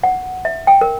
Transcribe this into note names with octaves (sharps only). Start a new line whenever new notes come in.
F#5
E5
G5
A#4